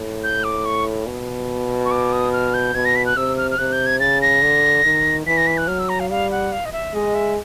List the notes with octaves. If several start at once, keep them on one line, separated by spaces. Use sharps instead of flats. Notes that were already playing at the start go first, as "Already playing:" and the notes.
Already playing: A2
G6
D6
C#6
B2
C#6
D6
D#6
F6
G6
B2 G#6
A#6
B6
F#6
C3 E6
F6
F6
C3 F#6
G6
G#6
C#3 A6
A#6
D3
D#3
E3 B6
A#6
B6
F#6
F#3 F6
E6
A#5
F5
G3 F5
F#5
F5
D#5
E5
G#3 D#5
E5